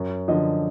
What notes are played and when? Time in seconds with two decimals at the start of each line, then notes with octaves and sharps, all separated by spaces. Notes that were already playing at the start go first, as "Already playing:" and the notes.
Already playing: F#2 C#5
0.28 D3 F3 D#5